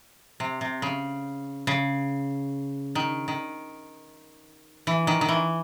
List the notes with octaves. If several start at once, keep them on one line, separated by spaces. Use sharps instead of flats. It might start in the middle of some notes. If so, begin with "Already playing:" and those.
C3
C3
C#3
C#3
D#3
D#3
E3
D#3
D#3
E3